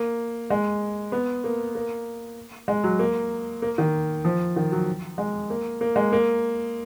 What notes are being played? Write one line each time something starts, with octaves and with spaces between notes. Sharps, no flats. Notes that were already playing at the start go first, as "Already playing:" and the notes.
Already playing: A#3
G#3
B3
A#3
A#3
G#3
F#3
A#3
A#3
D#3
F3
D#3
F#3
G#3
A#3
A#3
G#3
A#3